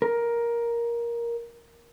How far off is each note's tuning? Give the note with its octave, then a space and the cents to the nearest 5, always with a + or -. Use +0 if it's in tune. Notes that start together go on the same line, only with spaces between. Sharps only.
A#4 +10